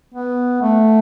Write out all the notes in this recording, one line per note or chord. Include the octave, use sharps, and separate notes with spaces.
B3
A3